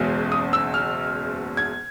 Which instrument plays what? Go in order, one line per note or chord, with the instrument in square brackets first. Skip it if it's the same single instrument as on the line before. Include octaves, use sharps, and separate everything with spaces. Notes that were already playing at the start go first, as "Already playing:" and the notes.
Already playing: [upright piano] F#1 E2 B2 G#3
D#6
E6
F6
G#6